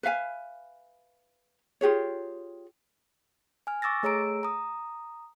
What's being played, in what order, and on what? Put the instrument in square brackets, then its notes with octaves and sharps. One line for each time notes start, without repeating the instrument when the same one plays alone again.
[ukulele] B4 E5 F5 G#5
F4 G4 G#4 C#5
[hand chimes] G#5 F6
C#6 D6 E6 A6 A#6
A3 G#4 C#5 A#5 E6 D7
A#5 D#6